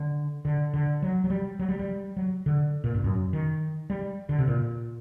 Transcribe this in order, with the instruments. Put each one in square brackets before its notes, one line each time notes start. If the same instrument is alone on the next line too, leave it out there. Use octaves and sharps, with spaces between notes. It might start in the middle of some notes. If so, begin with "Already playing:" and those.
Already playing: [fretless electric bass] D3
D3
D3
F#3
F#3
G3
F#3
G3
G3
F#3
D3
A#2
G2
F#2
D#3
G3
D3
C3
A#2